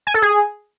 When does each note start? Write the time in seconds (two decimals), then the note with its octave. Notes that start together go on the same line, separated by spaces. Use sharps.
0.07 G#5
0.14 A4
0.22 G#4